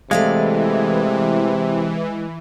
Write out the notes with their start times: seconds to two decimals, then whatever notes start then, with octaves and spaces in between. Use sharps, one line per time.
0.11 C3 E3 G#3 A3 D5 F5